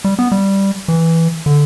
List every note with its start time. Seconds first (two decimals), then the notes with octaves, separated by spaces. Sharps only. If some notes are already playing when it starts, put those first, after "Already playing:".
0.05 G3
0.19 B3
0.32 G3
0.88 E3
1.46 D3